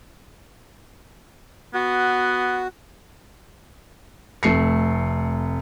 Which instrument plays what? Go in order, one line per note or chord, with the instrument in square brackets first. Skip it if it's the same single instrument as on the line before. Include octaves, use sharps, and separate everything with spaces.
[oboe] B3 [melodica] F#4
[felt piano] F1 A3 C7 C#7